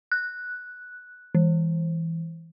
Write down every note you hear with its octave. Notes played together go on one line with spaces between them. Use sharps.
F#6
E3